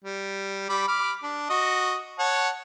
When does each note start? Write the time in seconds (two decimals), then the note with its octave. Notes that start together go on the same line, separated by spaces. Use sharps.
0.04 G3
0.69 G3 B5 D6
0.88 B5 D6 F6
1.23 D4
1.50 F#4 D#5
2.19 C#5 F#5 A5